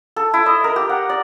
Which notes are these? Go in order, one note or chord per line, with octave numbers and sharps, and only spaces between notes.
A4
E4
D#5
A#4
G4
F#5
D5